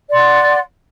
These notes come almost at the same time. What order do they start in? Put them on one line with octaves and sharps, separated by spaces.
D5 C6 F#5